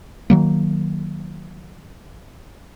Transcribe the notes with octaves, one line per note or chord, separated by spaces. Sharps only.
D#3 F#3 A#3